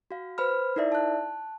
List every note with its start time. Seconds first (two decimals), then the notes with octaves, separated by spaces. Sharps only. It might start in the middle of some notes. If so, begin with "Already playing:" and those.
0.11 F#4 F5
0.38 B4 C5 B5 F6
0.76 D#4 E4 A#4 D5 E5
0.92 A5 F#6